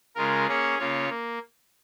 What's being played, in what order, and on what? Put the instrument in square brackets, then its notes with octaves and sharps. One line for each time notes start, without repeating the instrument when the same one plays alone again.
[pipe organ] C#3 G#3 F4 A#4
A#3 C#4 G#4 C#5
C#3 A#3 F4 C#5
A#3